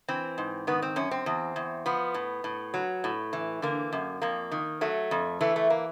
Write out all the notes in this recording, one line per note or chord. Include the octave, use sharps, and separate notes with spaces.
E3 C4
G#2
D#3 B3
C4
F#2 C#4
C4
E2
E2
F3 B3
A2
A2
F#3
A2
E3
D3 A#3
F#2
F2 A#3
D#3
F#3 A3
F2
E3 A3
A3
A#3